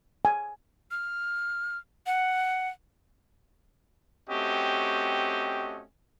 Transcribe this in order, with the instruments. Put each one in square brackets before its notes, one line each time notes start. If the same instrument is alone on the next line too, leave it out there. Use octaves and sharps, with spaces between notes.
[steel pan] G#5
[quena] F6
F#5
[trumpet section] A3 C4 C#4 F#4 G4 D#5